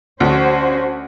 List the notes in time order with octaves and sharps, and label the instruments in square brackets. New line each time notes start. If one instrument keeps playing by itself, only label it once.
[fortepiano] D2 [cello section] C#4 F#4 C5